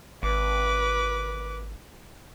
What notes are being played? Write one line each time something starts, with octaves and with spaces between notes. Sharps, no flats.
G#1 B4 D6